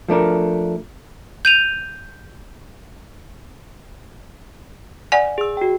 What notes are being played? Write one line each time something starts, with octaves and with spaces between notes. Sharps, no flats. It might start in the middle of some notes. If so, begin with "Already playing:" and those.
F3 A3 D4 A#4
G6 D#7 F7
D5 F#5 G#5
G#4 E6
F#4 G5